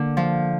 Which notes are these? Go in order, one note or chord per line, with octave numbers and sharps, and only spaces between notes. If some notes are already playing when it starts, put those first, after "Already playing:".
Already playing: D3 A#3
F3